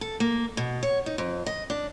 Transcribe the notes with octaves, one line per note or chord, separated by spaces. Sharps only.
A4
A#3
B2
C#5
D#4
F2
D#5
D4